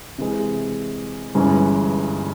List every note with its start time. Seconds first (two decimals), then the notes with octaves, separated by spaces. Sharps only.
0.18 C3 E3 G#3
1.35 G1 G2 E3 G#3 C#4